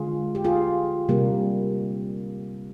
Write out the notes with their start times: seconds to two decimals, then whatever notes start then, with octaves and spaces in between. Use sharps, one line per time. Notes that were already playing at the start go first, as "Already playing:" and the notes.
Already playing: D3 G#3 F4 G#4
0.35 G4
0.44 F4 G#4
1.09 C3 G3 A#3